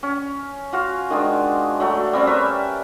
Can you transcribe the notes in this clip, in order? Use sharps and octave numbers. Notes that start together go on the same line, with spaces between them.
C#4
F4 F#4 F5
D#3 G#3 D4
F#3 A3
G3 C4 C#4
A#4 B4 E5